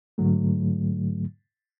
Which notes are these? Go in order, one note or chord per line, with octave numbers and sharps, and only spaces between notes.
G#2 D3 F#3 A3